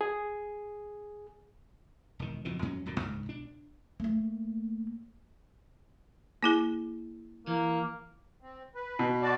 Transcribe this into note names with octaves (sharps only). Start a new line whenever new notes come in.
G#4
E1 D#3
F#1 F2 B2 D#3
F2 F#3 C#4
D1 F#2 A#2 D3
C#2 G#2
B1 D4
A3 A#3
A#3 E4 G#4
E3 A#3
C4
B4
B2
F#4 D5 A5